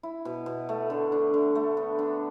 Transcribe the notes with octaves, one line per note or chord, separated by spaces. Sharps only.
E4
B2
B2
A3
D3
D4
D3
A3
B3
D4